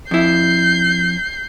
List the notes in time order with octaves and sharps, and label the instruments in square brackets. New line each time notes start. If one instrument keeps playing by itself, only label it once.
[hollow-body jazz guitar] F2 E4 [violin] G6 C7